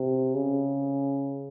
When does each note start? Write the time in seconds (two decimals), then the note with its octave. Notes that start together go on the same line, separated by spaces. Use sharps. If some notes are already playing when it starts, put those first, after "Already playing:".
Already playing: C3
0.34 C#3